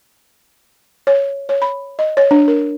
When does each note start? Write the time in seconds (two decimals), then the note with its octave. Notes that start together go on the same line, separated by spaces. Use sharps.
1.07 C#5
1.49 C#5
1.62 B5
1.99 D#5
2.17 C#5
2.31 D4
2.48 A#4